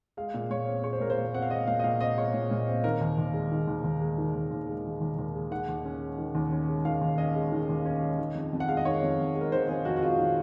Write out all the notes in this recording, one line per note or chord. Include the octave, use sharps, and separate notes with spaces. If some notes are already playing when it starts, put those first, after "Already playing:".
G#3 F5
A#2
A#2 C#5
C4
G#3 C#5
C5
A#2 A#4
C5
A#2
C4 F#5
F5
G#3 D#5
A#2 F5
D#5
A#2 F5
C4 D#5
G#3 C#5
A#2
A#2
C4
D#3 A#4
D#2
D#2
G#3
D#3
D#2
D#2
G#3
D#3
D#2
D#2
G#3
D#3
D#2
D#2
G#3
D#3 F#5
D#2
C#4
G#3
D#3
D#2
C#4
G#3
D#3 F5
D#2
C#4 D#5
G#3
D#3
D#2
C#4
G#3
D#3
F2
F2
F#5
G#3 F5
D#5
D#3 C#5
F2
F2
G#3
A#4
D#3 C5
F2 G#4
F2 F#4
F#4
G#3 F4
D#3